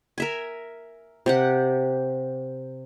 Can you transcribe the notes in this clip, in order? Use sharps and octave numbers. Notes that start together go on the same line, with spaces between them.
A#4 E5 G#5
C3 G4 F#5